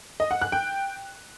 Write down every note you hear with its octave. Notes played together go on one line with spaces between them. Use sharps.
D#5
F#5
F#6
G5